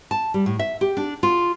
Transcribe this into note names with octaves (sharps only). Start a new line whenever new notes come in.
A5
G3
A2
E5
G4
D4
F4